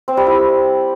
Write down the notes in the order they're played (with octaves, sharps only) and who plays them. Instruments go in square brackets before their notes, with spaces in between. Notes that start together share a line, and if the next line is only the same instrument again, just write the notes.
[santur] C4
G3
E4